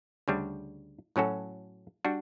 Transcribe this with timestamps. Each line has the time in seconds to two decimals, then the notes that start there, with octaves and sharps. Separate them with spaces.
0.28 D2 C#3 G3 D4
1.16 A2 F#3 C#4 F#4 A4
2.04 G3 D4 F#4